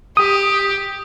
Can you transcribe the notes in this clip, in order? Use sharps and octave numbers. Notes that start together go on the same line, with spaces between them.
G4 D#6